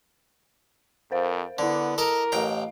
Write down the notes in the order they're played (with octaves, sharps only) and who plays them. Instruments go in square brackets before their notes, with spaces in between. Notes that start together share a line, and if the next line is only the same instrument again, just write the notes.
[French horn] F2 [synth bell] A#4 C5 F5
[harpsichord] D3 [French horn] B3 [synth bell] E4 D6
[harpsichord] A4 D#5 A#5 [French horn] A#4
[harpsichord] A1 G5 A#5 [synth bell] D#5 F5